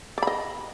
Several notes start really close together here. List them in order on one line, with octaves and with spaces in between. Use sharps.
D5 B5 D#5